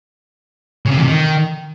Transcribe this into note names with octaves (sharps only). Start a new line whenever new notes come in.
C#3
C3
E2
C3
D#3